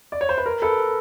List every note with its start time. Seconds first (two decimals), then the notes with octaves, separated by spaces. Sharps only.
0.12 D5
0.21 C#5
0.29 C5
0.38 B4
0.46 A#4
0.62 A4 B4